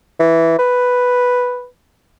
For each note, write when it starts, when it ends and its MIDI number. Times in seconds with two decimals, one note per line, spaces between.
0.20 0.58 52
0.59 1.66 71